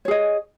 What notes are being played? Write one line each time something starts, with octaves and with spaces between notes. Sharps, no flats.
G#4 C#5 D#5